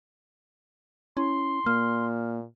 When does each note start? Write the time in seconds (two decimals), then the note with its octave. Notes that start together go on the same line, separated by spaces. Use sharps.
1.17 C#4 E4 C6
1.66 A#2 A#3 F6